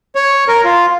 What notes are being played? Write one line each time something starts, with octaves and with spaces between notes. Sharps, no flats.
C#5
A#4
F4